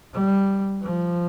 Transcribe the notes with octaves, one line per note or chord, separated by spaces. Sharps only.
G3
F3